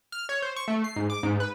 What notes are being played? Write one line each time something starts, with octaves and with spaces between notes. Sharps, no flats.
F6
C#5
C5
C#6
A3
C7
G#2
D6
G#2
B4